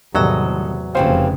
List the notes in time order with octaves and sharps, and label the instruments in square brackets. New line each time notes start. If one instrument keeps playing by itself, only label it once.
[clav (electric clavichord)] E2 F#3 [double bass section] A2 C3 [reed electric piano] D#3 G3 [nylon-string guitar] A4 D#5
[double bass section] F1 C#3 [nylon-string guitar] E3 G3 C#4 [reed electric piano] C5 F5